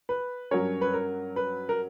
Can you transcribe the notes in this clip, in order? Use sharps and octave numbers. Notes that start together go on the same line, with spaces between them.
B4
G2 F#3 C#4 A#4 C#5
B4
A#4
B4
A#4